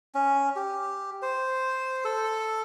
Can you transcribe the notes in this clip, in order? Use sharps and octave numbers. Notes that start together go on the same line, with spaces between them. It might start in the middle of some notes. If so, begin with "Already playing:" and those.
C#4
G4
C5
A4